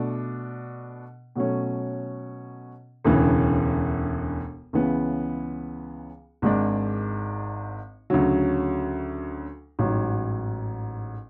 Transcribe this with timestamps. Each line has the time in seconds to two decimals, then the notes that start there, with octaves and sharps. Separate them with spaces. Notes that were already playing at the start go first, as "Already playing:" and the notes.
Already playing: B2 A3 D4 F#4
1.36 B2 F#3 A3 C#4
3.05 E1 D2 C#3 E3
4.73 C#2 C#3 E3 B3
6.42 G#1 G#2 G#3 D4
8.10 D2 C#3 F#3
9.79 A1 G#2 F#3